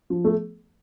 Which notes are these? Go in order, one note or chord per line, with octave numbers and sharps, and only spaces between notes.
F3
A3